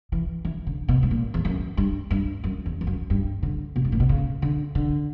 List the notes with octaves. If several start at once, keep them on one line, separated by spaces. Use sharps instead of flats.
E3
E3
D3
B2
G2
A#2
E2
F#2
G2
G2
F#2
E2
E2
F#2
G2
D3
B2
G2
A#2
B2
C#3
D3
D3